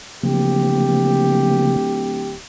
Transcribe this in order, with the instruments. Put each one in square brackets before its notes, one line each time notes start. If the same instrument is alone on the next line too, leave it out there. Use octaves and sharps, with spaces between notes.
[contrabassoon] D1 [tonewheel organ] C#3 F3 A#3 [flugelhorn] G4